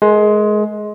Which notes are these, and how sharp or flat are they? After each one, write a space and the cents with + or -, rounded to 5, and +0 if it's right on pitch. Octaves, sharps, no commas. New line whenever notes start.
G#3 +20 A#4 +0